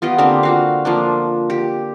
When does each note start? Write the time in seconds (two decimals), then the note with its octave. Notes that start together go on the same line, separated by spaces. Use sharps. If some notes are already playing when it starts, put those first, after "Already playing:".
0.02 B3 F4 G4 D#5
0.18 D3 A#3 C4 G4
0.43 F#4 F5
0.85 F3 A#3 D4
1.50 G4